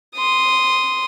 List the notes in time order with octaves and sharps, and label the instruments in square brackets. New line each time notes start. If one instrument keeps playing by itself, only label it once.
[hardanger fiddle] C6 D#6